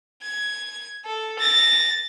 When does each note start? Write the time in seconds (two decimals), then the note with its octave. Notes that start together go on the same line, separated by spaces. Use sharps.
0.23 G#6
1.06 A4
1.40 A6 A#6